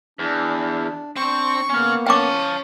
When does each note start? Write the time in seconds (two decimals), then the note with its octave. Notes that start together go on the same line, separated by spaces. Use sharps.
0.19 E2 D4
1.16 C4 D4 C#6
1.70 A#3 B3 C#4 F5
2.07 C#4 F5 G5 A5 D6